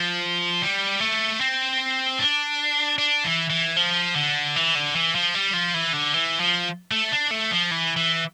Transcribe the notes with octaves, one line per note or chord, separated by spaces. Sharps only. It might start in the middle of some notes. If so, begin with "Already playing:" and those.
Already playing: F3
G3
A3
C4
D4
D4
E3
E3
F3
D3
E3
D3
E3
F3
G3
F3
E3
D3
E3
F3
A3
D4
A3
F3
E3
E3